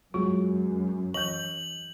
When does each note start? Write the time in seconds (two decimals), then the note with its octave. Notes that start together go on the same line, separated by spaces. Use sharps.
0.14 F#2 F#3 G#3 F4
1.14 E3 D#5 G6 F#7